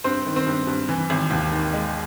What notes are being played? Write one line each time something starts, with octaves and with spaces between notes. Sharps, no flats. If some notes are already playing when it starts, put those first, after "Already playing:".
G2 C4 C5
D#3
C4 C5
G2
G2
E3
G#1
D#2
D#3
G#3